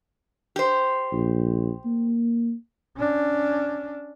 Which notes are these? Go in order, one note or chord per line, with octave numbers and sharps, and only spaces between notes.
G4 C5
A#1
A#3
C#4 D4